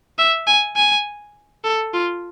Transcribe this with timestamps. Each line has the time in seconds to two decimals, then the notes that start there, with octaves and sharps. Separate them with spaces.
0.18 E5
0.47 G#5
0.76 G#5
1.64 A4
1.93 F4